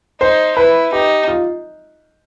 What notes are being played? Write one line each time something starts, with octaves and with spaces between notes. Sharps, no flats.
D#4 C5
E4 B4
D#4 G4
F4